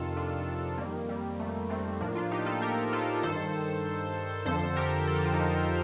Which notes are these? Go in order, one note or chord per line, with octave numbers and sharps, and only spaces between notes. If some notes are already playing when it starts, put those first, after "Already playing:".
Already playing: F2 C3 D#3 F4 A4
D4 F4
F2 D#3 G3 A#3
G3
A3
A3 C4
A2 F3 A#3 D4
D4 F4
D#4 G4
F4 A4
G4 A#4
F4 A4
G2 D#3 A4 C5
F2 D3 F3 A4 C5
G4 A#4
A4
G4
F4
D#4 G4